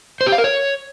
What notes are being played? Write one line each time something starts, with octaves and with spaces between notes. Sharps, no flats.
C5
G4
F5
A#4
C#5